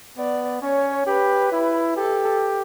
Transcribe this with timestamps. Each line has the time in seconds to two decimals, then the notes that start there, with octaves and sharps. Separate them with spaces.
0.17 B3 D5
0.62 C#4 C#5
1.07 G4 B4
1.52 E4
1.97 G4 A4